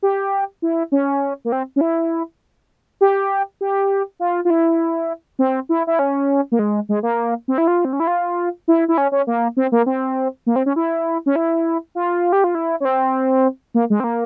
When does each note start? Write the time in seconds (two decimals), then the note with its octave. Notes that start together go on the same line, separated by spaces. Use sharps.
0.03 G4
0.62 E4
0.92 C#4
1.45 A#3
1.52 C4
1.76 C#4
1.81 E4
3.01 G4
3.61 G4
4.20 F4
4.45 F4
4.50 E4
5.39 C4
5.69 E4
5.87 E4
5.99 C#4
6.52 A#3
6.59 G#3
6.89 G#3
7.03 A#3
7.48 C4
7.58 E4
7.67 F4
7.85 C4
7.93 C#4
8.00 E4
8.07 F4
8.68 E4
8.88 E4
8.98 C#4
9.12 C#4
9.27 A#3
9.57 C4
9.72 A#3
9.86 C4
10.47 A#3
10.56 C4
10.66 C#4
10.76 E4
11.26 C#4
11.36 E4
11.95 F4
12.33 G4
12.44 F4
12.55 E4
12.80 C#4
12.85 C4
13.74 A#3
13.90 G#3
14.00 C4
14.04 A#3